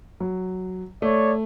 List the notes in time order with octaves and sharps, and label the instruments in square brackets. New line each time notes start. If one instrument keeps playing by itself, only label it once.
[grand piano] F#3
[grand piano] A3 [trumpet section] C#5 D5